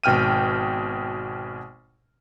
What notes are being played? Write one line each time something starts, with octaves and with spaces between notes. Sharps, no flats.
G#1 B2 G5 F6 D#7